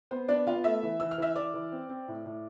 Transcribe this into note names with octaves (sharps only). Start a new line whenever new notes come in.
B3 C5
B3 D4 D5
B3 F4 F5
A3 E5 E6
E3
E3 E6
F6
E3 E5 E6
E3 D5 D6
E3
C4
C4
A2
A2